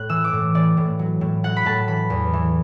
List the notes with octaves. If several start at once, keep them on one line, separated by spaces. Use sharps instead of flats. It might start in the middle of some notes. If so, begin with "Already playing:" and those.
Already playing: A2 F#6
E3 E6
D6
A2
E3 D5
A2
F#3
A2
F#3 F#5
B5
A2 A5
E3 B5
E2
E3